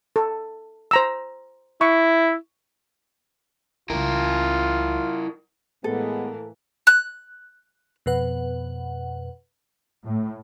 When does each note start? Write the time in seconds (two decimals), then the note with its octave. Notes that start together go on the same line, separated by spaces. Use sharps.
0.16 A4
0.91 C5 A#5 E6
1.81 E4 C#6
3.90 C#2 E3 E4 F4 A#4
5.84 A2 E3 G#3 A#3 B3 A4
6.87 F#6
8.06 F2 B2 B4 F#5
10.05 A2